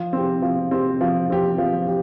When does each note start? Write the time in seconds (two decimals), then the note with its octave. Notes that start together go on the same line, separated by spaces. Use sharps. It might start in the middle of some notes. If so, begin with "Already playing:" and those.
Already playing: F3
0.13 C4 G4
0.42 F3
0.71 C4 G4
1.01 F3
1.30 C4 G4
1.58 F3
1.87 G4